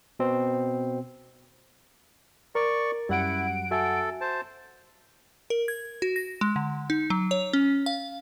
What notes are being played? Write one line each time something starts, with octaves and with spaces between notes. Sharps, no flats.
B2 C4
A#4 D5 C#6
F#2 G3 E4 F#5 D7
F#4 A4 E5 G#5
C5 A5
A#4
G#6
F#4
A#6
G#3
D3
D#4
F#3
C#5
C#4
F5